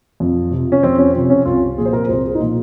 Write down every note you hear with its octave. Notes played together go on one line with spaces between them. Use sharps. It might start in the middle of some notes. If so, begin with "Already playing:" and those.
F2
C3 F3
C#4
F2 C4
C#4
C3 F3
C#4
C2 F4
A#2 F3 G#4
C5
A#4
C2 C5
G#4
D#4
A#2 F3 F4